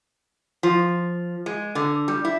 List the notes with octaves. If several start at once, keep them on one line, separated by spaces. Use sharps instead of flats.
F3
G#3
D3
G3
E4